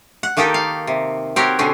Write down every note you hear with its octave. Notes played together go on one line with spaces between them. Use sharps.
F#5
D#3 A#3 D#4 G4 A4
F5
C3
C4 F#4 G4 A#4 C#5
B2 D3 C4 C#4